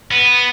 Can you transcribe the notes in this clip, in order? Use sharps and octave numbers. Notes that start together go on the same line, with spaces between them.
B3